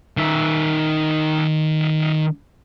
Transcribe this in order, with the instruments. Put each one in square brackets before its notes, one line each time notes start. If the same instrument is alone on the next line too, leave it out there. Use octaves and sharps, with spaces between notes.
[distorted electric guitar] D#3 E5